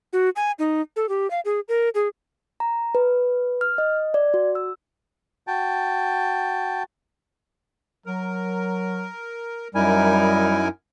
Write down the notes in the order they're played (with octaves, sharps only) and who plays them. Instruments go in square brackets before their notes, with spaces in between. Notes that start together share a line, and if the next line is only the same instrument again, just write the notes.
[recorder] F#4
G#5
D#4
A4
G4
F5
G#4
A#4
G#4
[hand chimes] A#5
B4
F6
D#5
D5
F#4
E6
[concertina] F#4 G5 A5
[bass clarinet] F#3 [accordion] A#4
[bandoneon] F#2 G#5 [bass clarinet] G3 [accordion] D#4 E4 A#4